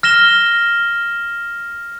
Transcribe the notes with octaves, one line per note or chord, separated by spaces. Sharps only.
F6 A#6 E7 G7